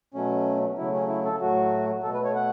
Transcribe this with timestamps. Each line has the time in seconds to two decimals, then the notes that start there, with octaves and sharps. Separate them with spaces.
0.14 B2 F#3 A3 C#4
0.78 C#3 F#3 A3 E4
0.93 C#4
1.09 E4
1.25 A4
1.41 A2 F#3 A3 F#4
2.03 B2 A3 A4
2.14 B4
2.25 C#5
2.35 F#5